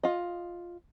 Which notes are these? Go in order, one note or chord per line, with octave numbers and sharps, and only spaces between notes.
F4 D#5